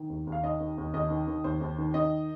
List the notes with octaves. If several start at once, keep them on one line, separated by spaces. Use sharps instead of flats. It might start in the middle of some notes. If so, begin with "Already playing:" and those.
Already playing: D#3
D#2
D#2
F5
D#3 D#5
D#3
D#2
D#2 D#5
D#3
D#3
D#2 C5
D#2
D#3
D#3 D#5